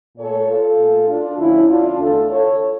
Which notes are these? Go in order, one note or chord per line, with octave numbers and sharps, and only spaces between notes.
A#2 A3 A4 C#5
F4 A4
A#2 A3
D4 F4
D2 D3 F3 C#4 E4
D4 F4
E2 D3 A3 F4 A4
A4 C#5